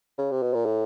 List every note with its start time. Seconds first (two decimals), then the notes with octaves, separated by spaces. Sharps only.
0.18 C#3
0.31 C3
0.42 B2
0.54 A#2
0.65 A2